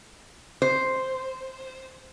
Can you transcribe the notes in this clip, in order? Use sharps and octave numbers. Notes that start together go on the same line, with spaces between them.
C5